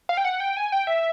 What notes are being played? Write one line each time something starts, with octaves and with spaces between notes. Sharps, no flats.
F5
G5
F#5
G5
G#5
G5
E5